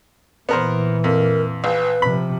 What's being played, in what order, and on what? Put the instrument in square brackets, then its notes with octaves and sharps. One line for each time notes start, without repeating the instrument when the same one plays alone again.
[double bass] A#2 E3 [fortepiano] B3 A#4 C5
[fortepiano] F2 [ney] A#4
[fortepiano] A#1 [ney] B4
[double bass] C3 F3 [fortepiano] B5